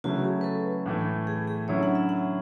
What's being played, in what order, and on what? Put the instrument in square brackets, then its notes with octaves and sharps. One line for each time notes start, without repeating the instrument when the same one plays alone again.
[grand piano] C#3 F#3 A3 E4 [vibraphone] F#4
[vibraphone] G#4
B4
A4
[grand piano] A2 E3 A3
[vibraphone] G#4
G#4
[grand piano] D3 F#3 C#4 E4 [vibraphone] C#5
[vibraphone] F#5
E5
F#5